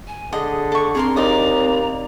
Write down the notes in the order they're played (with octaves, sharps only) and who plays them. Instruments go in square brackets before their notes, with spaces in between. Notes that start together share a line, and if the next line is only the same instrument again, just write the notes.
[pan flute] G#5
[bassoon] D3 [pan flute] G#4 [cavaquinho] D#5
[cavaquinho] A4 C#6
[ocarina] C4 [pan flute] D4 [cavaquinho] G#4 A#4 C6
[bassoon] D#2 [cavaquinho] D#4 D5 D#6 [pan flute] A#5